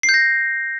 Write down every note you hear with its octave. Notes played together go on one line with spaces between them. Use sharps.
C7
G6
A#6